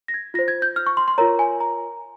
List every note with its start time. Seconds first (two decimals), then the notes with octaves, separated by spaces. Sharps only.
0.08 A#6
0.14 G#6
0.34 F4 C5 A#6
0.48 G#6
0.62 G6
0.76 F6
0.86 C#6
0.97 C6
1.08 C6
1.18 F4 A#4 C#5 A#5
1.39 G#5
1.60 A#5